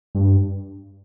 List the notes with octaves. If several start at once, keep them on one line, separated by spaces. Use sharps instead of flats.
G2